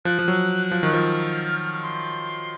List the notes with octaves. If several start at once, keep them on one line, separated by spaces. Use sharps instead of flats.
F3 F#6
F3
F#3
F3
D#3
F3 F6
C6